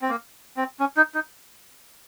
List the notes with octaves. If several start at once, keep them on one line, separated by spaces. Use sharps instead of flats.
C4
A#3
C4
C#4
D#4
D#4